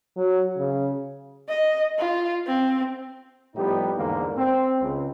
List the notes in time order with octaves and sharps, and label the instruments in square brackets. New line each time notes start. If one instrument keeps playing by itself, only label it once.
[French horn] F#3
C#3
[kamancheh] D#5
F4
C4
[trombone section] A2 F3 G3 B3 D#4 G4
E2 G#2 D3 A#3
C4
C#2